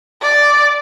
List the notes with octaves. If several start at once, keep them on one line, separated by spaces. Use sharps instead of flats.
D5